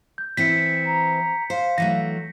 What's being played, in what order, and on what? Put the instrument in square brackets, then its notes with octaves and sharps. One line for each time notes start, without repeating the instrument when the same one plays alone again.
[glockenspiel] G6
[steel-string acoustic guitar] E3 C4 E4 [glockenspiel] B6 C#7
[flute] A#5
[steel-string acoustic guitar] C5 [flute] F5
[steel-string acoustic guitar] E3 F#3 A3 [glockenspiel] A#6